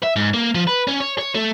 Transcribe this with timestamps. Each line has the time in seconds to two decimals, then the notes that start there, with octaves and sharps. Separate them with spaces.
0.03 E5
0.16 G#2
0.34 A#3
0.55 F3
0.67 B4
0.87 C#4
1.00 C#5
1.18 C#5
1.35 A3